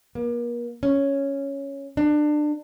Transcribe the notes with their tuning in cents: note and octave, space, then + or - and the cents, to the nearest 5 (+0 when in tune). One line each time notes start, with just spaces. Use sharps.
A#3 +40
C#4 +0
D4 +25